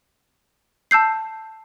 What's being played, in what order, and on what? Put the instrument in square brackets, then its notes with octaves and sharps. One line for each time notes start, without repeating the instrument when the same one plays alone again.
[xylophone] A5 E6 G6 C7